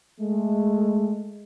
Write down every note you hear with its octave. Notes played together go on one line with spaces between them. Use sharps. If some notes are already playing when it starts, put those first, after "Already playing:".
G#3 A3